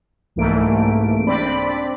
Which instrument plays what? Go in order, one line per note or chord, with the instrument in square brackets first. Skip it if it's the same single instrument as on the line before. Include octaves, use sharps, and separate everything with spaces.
[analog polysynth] C2 G#2 E3 A3 A#3 D7
C4 D4 D5 B5